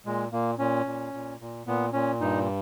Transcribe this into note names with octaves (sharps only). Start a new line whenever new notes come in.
A#2 G#3
A#2 A#3
A#2 C#4
A#2
A#2
A#2
A#2 B3
A#2 C#4
G2 D#4